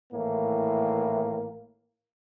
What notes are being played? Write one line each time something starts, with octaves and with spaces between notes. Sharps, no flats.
G#1 A2 E3 A#3